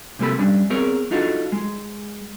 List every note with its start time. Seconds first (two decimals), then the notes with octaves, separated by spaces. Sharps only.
0.19 C3 G#3 A#3 A4 B5
0.39 G3 C#4 D4
0.70 B3 C4 G#4 A#4 C#5
1.11 D4 D#4 F4 F#4 A4
1.52 G#3